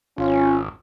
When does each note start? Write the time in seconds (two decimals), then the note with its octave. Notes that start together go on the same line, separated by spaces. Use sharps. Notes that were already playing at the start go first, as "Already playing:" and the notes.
0.18 G#1 C#4 F4